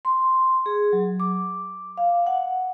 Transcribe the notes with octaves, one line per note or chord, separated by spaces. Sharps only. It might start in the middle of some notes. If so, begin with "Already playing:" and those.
C6
G#4
F#3
D6
F5
F#5